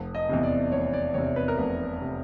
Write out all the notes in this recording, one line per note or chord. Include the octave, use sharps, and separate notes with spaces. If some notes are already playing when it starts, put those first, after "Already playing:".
Already playing: F1
D#5
E2 C3
D5
F1 C#5
D5
E2 C3 C#5
B4
A#4
F1 B4
C3